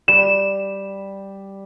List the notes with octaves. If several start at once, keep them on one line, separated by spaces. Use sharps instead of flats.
G3 E7